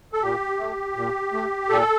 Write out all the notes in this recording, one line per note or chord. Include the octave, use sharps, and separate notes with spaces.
A4
A#2 G4
A3
A#2
A3
A#2 A4